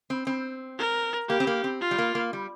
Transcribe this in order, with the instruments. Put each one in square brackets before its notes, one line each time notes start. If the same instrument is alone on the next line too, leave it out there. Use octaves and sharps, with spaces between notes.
[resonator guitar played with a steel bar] C4
C4
[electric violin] A#4
[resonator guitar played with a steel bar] A#3 [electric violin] G4
[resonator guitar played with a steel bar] C4
A#3
C4
[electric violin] F4
[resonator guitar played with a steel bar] G3
A#3
A#3
G3